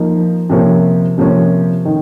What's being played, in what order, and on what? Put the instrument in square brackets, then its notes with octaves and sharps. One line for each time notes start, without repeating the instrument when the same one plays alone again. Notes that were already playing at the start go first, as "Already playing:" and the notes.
Already playing: [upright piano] F3 A#3 D#4
C3 F3 A#3 C#4
C3 F3 A#3 C#4
D#3